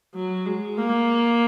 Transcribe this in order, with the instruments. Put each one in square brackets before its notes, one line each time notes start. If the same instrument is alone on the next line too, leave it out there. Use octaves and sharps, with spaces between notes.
[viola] F#3
G#3
A#3